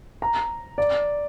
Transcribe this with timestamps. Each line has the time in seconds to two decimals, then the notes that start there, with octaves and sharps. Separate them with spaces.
0.22 A#5
0.78 D5